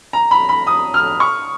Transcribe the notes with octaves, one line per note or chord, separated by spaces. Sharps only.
A#5
B5
B5
D#6
F6
C#6